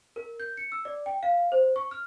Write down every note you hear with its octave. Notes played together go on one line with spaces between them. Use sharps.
A#4
G6
C#7
E6
D5
G5
F5
C5
C#6
F6